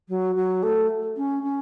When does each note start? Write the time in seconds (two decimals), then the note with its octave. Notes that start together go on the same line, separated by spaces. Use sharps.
0.08 F#3
0.35 F#3
0.62 A3
1.16 C#4
1.43 C#4